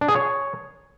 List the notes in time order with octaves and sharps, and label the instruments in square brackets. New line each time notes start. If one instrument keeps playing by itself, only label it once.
[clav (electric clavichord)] D4
G#4
C#5